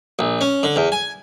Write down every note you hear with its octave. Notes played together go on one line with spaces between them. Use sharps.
A#1
C#4
D3
E2
G#5